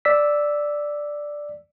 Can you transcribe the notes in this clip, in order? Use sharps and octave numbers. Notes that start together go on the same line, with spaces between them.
D5 E6 B6